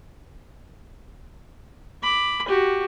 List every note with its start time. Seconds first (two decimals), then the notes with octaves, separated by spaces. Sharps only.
2.03 B5 D6
2.48 F#4 G4